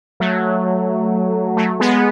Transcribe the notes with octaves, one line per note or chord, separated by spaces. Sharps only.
F#3 A3
F#3 A3
G#3 B3